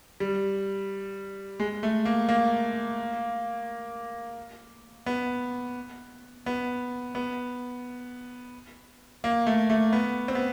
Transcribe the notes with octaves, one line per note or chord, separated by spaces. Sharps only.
G3
G#3
A3
A#3
A#3
B3
B3
B3
A#3
A3
A3
B3
C4
B3